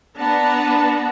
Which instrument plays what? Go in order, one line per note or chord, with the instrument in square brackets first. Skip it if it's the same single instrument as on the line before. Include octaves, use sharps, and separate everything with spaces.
[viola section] B3 D4 B4 F#5 A5 A#5